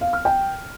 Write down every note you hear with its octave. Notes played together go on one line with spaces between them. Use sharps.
F5
F6
G5